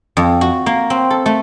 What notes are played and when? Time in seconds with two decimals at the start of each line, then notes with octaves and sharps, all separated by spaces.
0.17 F2
0.41 F#4
0.66 A#3
0.90 C4
1.10 A4
1.26 A3